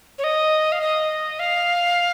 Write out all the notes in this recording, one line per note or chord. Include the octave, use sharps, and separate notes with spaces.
C#5
D#5
F5
D#5
F5